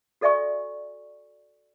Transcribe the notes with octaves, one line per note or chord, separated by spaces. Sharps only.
F#4 A4 D5 E5 G#5 C#6